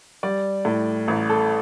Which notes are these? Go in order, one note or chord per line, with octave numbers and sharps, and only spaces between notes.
G3 D5
A2
A1
A4